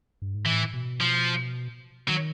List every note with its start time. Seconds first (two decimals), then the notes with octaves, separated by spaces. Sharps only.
0.22 G2
0.34 G#2
0.46 A2 E3
0.74 B2
1.01 F3
2.08 D#3 F#3